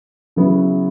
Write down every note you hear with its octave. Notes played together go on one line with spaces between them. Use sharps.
C#3 F#3 B3 E4